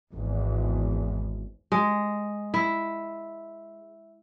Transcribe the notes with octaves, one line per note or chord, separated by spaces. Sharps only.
G#1 E2
G#3
E4